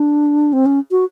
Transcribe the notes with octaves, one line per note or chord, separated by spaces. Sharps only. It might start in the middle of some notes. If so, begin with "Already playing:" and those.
Already playing: D4
C4
C#4
F#4